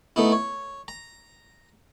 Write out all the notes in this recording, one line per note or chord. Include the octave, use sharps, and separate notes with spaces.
A3 B3 D#4 E4
C#5
A#5